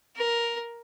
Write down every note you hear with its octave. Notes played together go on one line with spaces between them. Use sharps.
A#4